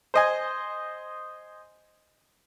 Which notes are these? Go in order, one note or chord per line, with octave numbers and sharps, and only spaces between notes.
C5 D#5 G#5